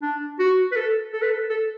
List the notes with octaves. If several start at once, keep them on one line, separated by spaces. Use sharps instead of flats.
D4
F#4
B4
A4
A4
B4
A4
A4